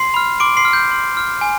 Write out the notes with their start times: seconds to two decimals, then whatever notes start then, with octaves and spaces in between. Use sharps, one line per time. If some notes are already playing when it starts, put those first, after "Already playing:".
Already playing: C6 C7
0.14 B5 F6
0.40 C6 D6 D7
0.57 C6 C7
0.65 F6
0.73 G6
0.91 C6
1.17 F6
1.41 G#5